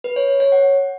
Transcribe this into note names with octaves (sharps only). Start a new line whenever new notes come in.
B4
C#5
C#5
C#5
F#5